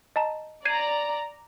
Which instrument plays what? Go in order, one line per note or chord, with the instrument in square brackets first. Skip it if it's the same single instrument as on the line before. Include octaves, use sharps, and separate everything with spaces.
[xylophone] D#5 A5 A#5
[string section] D5 A#5 [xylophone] G#6 C7 D#7